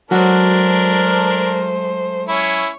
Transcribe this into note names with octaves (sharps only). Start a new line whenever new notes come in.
F#3 G#3 A3 D4 F#4 A#4 C5
C#4 E4 C#5